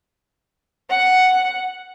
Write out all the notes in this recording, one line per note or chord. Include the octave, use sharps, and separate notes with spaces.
F#5